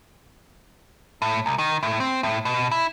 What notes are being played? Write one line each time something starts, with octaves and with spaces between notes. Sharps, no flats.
A2
C2
D#3
A2
C4
A2
B2
E4